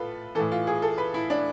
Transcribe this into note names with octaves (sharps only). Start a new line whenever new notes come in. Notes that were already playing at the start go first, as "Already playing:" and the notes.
Already playing: A2 F4 A4 B4
A2 E3 A4
F4
G#4
A4
B4
E4
D4